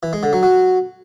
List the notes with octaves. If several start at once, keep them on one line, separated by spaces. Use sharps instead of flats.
E3
G#3
D3
F#3
F#3